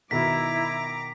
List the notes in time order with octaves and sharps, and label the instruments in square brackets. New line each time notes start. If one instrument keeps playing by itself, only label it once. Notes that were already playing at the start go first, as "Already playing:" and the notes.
[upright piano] B2 D#3 [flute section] E4 [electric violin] A#5 D6 [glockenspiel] B6